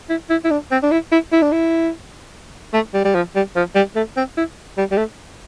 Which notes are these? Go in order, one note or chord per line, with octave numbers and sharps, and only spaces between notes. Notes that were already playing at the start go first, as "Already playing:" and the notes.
E4
E4
E4
D4
C4
D4
E4
E4
E4
D4
E4
A3
G3
G3
F3
G3
F3
G3
A3
C4
E4
G3
G3
A3